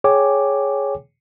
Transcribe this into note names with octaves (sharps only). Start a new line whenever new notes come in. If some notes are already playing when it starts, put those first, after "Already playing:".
G#4 C#5 G5 G#5 D6